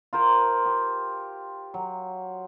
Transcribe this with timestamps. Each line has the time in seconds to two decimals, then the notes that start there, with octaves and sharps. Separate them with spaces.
0.13 F4 A#4 C5
0.65 G4
1.74 F#3